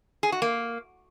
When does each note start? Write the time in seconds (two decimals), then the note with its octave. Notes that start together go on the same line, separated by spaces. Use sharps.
0.23 G#4
0.32 F#4
0.42 A#3